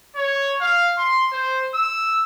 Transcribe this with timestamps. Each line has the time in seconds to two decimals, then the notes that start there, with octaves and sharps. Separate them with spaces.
0.16 C#5
0.61 F5
0.98 C6
1.32 C5
1.74 E6